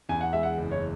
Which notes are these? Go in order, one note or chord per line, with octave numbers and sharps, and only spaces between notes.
E2 G#5
F#5
G#3 E5
F#5
F#1
C#5